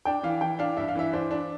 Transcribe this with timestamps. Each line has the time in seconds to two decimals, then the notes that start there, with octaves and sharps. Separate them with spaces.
0.05 D4 G5
0.23 E3 F5
0.41 E3 G5
0.59 D4 F5
0.77 G2 E5
0.89 F5
0.96 E3 E5
1.13 D4 C5
1.31 D4